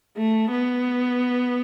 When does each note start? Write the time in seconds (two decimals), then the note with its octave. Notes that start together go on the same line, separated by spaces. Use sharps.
0.18 A3
0.51 B3